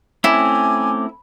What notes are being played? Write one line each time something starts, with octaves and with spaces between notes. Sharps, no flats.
A3 C4 C#4 E4 G#5 D6